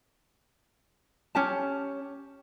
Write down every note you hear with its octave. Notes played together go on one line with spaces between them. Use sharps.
C#4 G4 A5